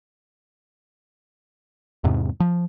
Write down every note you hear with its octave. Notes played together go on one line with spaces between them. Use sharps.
E2 G#2 C3
F3